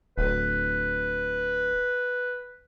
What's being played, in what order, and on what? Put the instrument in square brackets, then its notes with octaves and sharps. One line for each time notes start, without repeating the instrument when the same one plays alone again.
[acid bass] D1 [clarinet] B4